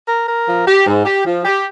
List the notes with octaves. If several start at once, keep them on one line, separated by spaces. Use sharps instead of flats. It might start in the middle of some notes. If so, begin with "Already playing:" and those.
A#4
A#4
F3
G4
G#2
G4
F3
G4